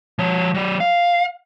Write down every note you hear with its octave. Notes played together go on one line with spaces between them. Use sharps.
F3 C#5
F#3 D5
F5